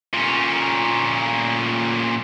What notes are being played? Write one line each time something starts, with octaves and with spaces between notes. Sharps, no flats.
A#2 C#4